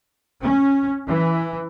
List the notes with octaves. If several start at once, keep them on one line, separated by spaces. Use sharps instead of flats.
C#4
E3